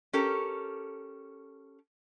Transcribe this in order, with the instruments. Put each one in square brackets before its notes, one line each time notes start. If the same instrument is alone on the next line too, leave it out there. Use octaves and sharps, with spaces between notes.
[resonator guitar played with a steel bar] C#4 G4 A4 A#4